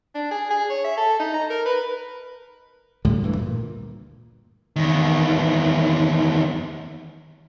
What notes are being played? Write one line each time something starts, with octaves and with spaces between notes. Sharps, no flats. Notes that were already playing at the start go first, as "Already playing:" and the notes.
D4
G#4
G#4
C#5
E5
A4
D#4
A#5
A#4
B4
D2 A2 D3 G3
D2 G2 E3
A#2
E2 D#3